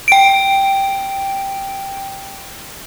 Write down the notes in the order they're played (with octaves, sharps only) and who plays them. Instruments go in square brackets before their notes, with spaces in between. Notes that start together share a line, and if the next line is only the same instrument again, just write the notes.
[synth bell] G5 D7